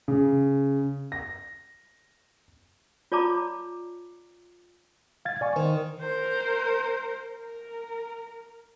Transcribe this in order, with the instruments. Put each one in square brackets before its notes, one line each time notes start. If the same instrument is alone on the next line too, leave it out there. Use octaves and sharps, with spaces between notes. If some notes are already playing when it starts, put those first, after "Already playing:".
[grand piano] C#3
A#6
[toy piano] F4 C#5 D5 A5 A#5 D6
[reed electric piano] F5 G#6 A6
D5 G#5 C#6
[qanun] D#3 [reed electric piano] C5
[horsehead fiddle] A#4 C5
A#4